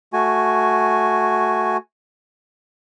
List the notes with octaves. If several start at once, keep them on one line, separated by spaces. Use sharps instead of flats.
A3 F#4 G#5